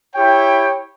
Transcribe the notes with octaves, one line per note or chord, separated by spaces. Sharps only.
E4 G4 C#5 G5